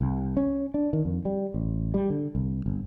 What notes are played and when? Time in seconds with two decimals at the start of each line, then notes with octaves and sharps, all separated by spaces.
0.01 C2
0.37 C#4
0.74 D4
0.93 D#3
1.05 F2
1.25 G3
1.54 A1
1.94 G3
2.10 D3
2.35 C2
2.66 G1